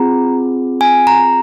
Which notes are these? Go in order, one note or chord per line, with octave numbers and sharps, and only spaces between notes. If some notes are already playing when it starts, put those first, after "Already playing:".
Already playing: C4 F4 G#4 A#5
G#5
A#5